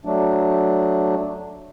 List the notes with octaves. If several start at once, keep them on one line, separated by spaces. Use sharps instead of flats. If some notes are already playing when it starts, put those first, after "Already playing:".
F#3 A3 D4